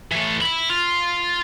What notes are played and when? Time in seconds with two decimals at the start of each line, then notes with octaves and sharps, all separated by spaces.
0.11 E3 A3
0.41 E5 B5
0.69 F4